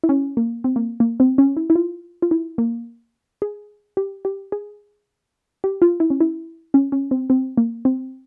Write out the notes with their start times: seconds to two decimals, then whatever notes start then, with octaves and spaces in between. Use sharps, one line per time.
0.04 E4
0.09 C#4
0.37 A#3
0.64 C4
0.76 A#3
1.00 A#3
1.20 C4
1.38 C#4
1.57 E4
1.70 E4
1.76 F4
2.22 F4
2.31 E4
2.58 A#3
3.42 G#4
3.97 G4
4.25 G4
4.52 G#4
5.64 G4
5.82 F4
6.00 E4
6.10 C#4
6.21 E4
6.74 C#4
6.92 C#4
7.11 C4
7.30 C4
7.57 A#3
7.85 C4